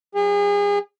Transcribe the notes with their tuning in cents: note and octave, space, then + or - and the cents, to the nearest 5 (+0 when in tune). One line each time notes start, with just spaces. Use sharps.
F#3 -10 G#4 -35